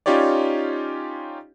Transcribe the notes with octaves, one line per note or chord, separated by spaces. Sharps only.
C#4 D#4 F4 G4 C#5 D5